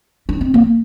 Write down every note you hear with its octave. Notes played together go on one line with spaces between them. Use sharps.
D4
C4
A#3